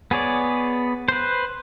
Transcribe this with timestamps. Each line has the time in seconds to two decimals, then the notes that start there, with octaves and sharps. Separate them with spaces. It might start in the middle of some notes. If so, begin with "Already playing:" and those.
0.11 B3 G#4 C#5 D5
1.08 B4 C5